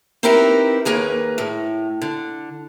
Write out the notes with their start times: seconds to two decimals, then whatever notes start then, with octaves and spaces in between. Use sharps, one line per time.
0.23 C4 D#4 E4 G4 A#4 B4
0.85 D#2 A#3 G#4 B4
1.38 A2
2.02 D3